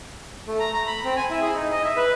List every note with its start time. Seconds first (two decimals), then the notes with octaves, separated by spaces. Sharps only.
0.47 A3
0.60 A#5
0.73 A#5
0.87 B5
1.05 C4
1.16 G#5
1.30 E4
1.42 G#4
1.55 D#4
1.72 D#5
1.84 E5
1.97 B4